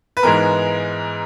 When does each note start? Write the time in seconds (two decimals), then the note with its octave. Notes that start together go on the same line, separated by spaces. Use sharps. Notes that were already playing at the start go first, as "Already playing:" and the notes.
0.17 B4
0.23 G#2 E3 G#3 B3 A#4